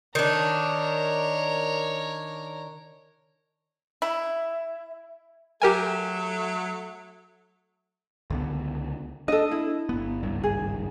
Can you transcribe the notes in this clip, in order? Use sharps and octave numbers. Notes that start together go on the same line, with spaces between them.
D#3 D4 A#4 C#5
E4
F#3 A3 G4 A4 A#4 G#5
C#2 D3 B3
D4 A4 D#5
E4
G1 B3
G#1 C#2 G2
G#4